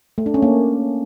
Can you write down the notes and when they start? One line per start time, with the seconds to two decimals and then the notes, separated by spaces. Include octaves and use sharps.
0.18 A3
0.26 D4
0.34 C#4
0.42 A#3